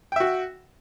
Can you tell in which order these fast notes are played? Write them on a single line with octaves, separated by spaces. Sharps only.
G5 E5 F#4